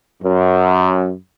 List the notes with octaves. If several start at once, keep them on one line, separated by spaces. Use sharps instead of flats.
F#2